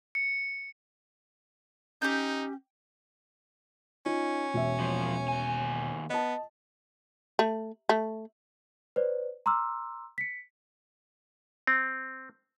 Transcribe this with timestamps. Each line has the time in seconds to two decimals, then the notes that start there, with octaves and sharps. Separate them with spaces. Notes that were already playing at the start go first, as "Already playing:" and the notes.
0.15 C#7
2.02 C#4 D#4 G4 G6
4.06 C#4 D#4 F4
4.54 E1 E5
4.80 A#2 F3
5.28 D#2 G#5
6.10 B3 D#5 A5
7.39 A3
7.89 A3
8.96 B4 C5 D5
9.46 A#5 C6 D6 E6 F6
10.18 B6 C#7
11.67 C4